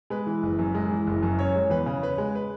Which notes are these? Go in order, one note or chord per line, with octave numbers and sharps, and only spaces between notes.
G#3 B4
E3
F#1
F#2
G#3
E3
F#1
F#2
C#4 C#5
G#3
E2 B4
C#3
C#4 B4
G#3
B4